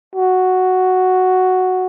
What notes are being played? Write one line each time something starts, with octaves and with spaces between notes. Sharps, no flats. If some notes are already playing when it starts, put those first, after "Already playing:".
F#4